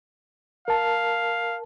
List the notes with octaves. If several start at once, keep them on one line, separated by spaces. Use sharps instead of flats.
A#4 F5 A5